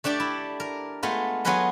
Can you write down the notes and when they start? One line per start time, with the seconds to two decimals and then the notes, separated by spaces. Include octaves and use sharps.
0.04 A3 D4 G4 D5 G5
0.20 E4
0.60 A#4
1.03 G#3 A3 B3 F4
1.45 F#3 B3 F4 G#4 B4 D#5